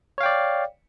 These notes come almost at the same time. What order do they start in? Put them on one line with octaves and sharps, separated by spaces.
C#5 F5 G5 D5